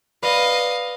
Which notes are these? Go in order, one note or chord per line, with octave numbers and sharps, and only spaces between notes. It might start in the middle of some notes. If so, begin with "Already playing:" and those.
B4 D5 D#5 F5